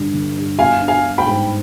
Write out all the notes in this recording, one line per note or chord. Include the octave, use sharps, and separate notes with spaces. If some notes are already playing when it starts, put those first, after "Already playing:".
Already playing: G2 D3 G3 D4
D3
G2
B3 F5 G#5
D4
F5 G#5
G3
G5 B5
G#2